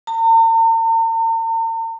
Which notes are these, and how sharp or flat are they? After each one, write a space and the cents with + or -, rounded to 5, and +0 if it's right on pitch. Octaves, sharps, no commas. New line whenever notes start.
A#5 -45